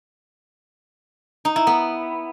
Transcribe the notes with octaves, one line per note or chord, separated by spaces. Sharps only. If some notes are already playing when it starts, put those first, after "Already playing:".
D#4
E4
B3